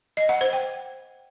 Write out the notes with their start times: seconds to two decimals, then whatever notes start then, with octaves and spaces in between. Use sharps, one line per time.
0.17 D#5
0.29 F#5
0.41 C5
0.53 G5